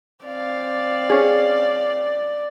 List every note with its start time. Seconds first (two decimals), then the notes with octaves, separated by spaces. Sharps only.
0.25 C4 D5 F5
1.10 C#4 G#4